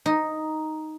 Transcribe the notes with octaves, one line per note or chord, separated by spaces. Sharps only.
D#4